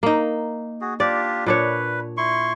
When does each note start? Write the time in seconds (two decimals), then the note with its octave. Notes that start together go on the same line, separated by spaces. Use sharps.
0.03 A#3 D#4
0.81 F#4 G#4
1.00 D4 F4 G4 D5
1.46 A#2 D4 B4 C#5
2.17 E4 C6 C#6